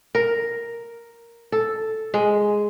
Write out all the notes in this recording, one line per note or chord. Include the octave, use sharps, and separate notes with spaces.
A#4
A4
G#3